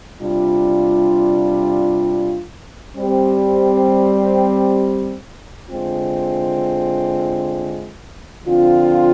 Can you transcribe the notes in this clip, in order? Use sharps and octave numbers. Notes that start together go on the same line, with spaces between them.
C3 G3 D4 F4
G3 C4 G4
D3 G#3 C4 F4
D3 F3 C4 F4